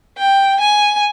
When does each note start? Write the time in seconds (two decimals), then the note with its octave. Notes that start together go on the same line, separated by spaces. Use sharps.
0.18 G5
0.61 G#5